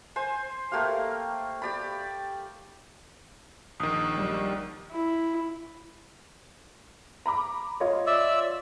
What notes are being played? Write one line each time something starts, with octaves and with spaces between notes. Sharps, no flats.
C5 G#5
A3 A#3 G4 F5
G4 D5 B5
A#1 D#3 D#6
G3
E4
A#5 B5 D6
F4 C#5 D#5
D5 E5 E6